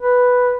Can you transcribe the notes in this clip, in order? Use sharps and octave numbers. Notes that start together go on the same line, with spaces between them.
B4